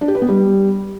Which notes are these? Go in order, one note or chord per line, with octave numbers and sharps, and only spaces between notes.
D4
G4
B4
B3
G3